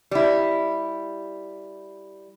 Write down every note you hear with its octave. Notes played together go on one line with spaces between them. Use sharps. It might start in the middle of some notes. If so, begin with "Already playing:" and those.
G3 E4